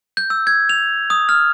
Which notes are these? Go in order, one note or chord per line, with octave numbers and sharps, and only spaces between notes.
G6
E6
G#6
F7
D#6
F6